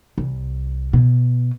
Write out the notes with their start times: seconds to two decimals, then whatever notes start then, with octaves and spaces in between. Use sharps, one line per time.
0.18 C2
0.93 B2